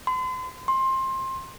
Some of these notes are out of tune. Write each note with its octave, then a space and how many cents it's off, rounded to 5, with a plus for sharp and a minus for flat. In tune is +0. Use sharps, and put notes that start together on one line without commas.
C6 -40
C6 +20